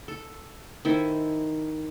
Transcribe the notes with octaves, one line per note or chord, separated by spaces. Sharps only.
A4
D#3 E4 A4 C5